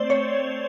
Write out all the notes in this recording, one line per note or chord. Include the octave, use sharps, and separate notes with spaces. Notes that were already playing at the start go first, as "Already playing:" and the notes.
Already playing: A3 C4 C5 D5
C#5